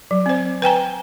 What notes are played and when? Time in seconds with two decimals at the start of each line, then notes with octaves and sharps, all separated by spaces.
0.11 F#3
0.26 C4 C5
0.62 B4 G5 G#5 A#5